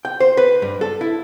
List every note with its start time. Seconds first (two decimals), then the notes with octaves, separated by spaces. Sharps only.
0.05 G5
0.20 C5
0.37 B4
0.62 G2
0.81 A4
1.01 E4